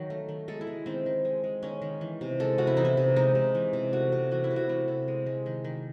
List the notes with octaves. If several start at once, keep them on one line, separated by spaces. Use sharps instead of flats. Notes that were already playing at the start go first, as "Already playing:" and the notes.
Already playing: D#3 F#3
A3
D#3
G#3 A4
E4
G#3
D#3 C4
D#3
G#3
G#3
D#3 C#4
D#3
E3
C3
G#3 A4
C3 F#4
E4
E3 D#4
E4
C3
G#3 D#4
C3
E3
C3
A3 F#4
C3
E3 F#4
E4
C3
F#4
A3 E4
C3
G#3
G#3
D#3
D#3